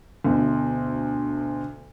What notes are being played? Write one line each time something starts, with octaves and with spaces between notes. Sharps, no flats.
D2 B2